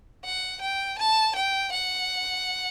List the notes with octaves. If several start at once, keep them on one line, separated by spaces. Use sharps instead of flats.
F#5
G5
A5
G5
F#5